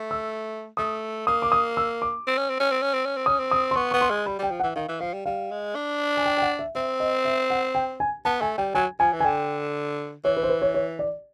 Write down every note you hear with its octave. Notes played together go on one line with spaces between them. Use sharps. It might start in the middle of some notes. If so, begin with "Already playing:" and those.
Already playing: A3
E6
A3 D#6
A#3 D#6
D6
D#6
E6
D6
C4
C#4
C4
C#4
C4
C#4
C4
C#4
C4
C#4 D#6
C4
D#6
C6
B3 C#6
B3 C#6
C6
G#3
G3 B5
G3 G5
F3
F#5
E3
D#3 F5
E3
F3 F5
G3
G3 F5
G#3
D4
G#5
G5
G5
F#5
E5
C4 E5
D#5
E5
F#5
G5
G#5
B3 A5
A3 G#5
G3 G5
F#3 G#5
F3 G#5
E3
G#5
D3 G5
E3 C#5
B4
C5
B4
C#5
C#5
D5